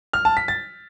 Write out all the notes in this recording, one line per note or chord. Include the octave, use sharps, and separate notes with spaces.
F6
A5
B6
A6